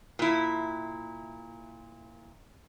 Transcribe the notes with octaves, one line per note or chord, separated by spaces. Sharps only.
A#2 E4